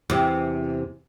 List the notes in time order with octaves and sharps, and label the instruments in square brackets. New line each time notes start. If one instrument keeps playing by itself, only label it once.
[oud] E2 C3